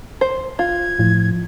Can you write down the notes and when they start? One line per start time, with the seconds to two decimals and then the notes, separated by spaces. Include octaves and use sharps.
0.21 C5
0.59 F4 G#6
0.99 A2 F3